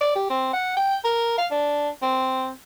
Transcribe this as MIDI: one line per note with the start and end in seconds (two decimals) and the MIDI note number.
0.01 0.13 74
0.15 0.27 67
0.30 0.50 60
0.53 0.76 78
0.77 0.97 79
1.04 1.37 70
1.38 1.46 77
1.51 1.88 62
2.02 2.50 60